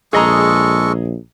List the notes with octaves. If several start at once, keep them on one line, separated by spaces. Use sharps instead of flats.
A#1 G#3 G#4 A4 D#5 A#5 C#6